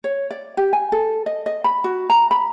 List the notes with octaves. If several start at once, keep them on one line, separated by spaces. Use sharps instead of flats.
C#5
D5
G4
G#5
A4
D#5
D#5
B5
F#4
A#5
B5